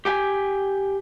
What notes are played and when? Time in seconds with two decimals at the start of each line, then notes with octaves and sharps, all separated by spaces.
0.05 G4 G5 G#5